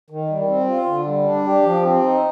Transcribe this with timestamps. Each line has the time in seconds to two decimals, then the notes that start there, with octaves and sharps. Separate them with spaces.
0.10 D#3
0.29 G3
0.48 C4
0.67 F4
0.86 D3
1.06 G3
1.24 D4
1.45 G4
1.63 F3
1.83 C4
2.02 D#4